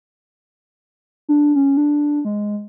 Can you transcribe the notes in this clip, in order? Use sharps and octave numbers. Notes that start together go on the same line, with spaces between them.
D4
C#4
D4
G#3